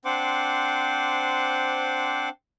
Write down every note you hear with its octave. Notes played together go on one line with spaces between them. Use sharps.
C4 D4 C5 F#5 C6 D6